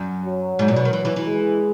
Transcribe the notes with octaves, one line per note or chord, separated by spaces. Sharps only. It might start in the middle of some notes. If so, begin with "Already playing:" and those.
Already playing: F#2
F#3
G#2
A#2
B2
D#3
E3
E3
E3
G#3